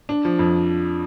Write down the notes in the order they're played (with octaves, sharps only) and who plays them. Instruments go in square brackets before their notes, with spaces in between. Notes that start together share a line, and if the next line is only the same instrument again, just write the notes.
[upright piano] D4
F3
F2